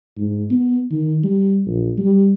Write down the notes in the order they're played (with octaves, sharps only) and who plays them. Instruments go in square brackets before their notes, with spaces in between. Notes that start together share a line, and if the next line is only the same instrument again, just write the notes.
[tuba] G#2
B3
D#3
G3
A#1
G3